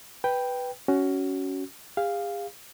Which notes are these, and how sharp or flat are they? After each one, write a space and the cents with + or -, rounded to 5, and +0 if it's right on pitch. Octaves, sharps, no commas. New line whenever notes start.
B4 +0 G5 +0
C#4 +10 F#4 +15
G#4 -40 F5 +0